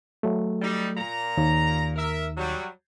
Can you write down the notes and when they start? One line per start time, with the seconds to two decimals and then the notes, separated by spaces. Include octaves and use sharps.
0.23 F#3 A3
0.61 G3 D#4
0.96 A#2 A#5
1.37 D#2 D#3
1.96 A#4 E5
2.37 F#3 G3